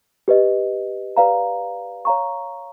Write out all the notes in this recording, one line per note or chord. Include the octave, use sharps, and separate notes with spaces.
G4 B4 D#5
G4 B4 D5 F5 A#5
C#5 F5 A#5 C#6